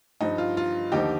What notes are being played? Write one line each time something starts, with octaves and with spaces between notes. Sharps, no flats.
G2 F3 D#4
F4
F4
D#2 D3 F3 D#4 G4